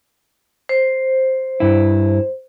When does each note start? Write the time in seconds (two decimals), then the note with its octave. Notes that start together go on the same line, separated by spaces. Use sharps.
0.69 C5
1.60 G2 E4